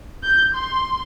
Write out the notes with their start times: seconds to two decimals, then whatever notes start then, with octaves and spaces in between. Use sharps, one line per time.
0.24 G6
0.55 C6